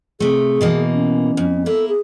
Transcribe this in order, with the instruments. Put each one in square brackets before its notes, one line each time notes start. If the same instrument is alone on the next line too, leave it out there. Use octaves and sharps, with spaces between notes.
[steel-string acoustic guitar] C3 A3 [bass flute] G#4
[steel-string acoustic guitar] B2 E3 A#3
[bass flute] C#4
[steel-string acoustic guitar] F2
[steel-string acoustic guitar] A#3 E4 [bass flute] A4
[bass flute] G#4